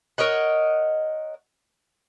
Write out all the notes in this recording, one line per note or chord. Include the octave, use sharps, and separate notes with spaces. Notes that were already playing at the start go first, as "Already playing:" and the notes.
A#4 C#5 D#5 F#5